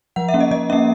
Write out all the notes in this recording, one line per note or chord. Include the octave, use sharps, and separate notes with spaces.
F3 F#5
E5
A#3 C#4
D#5
F3 D#5
A#3 C#4 E5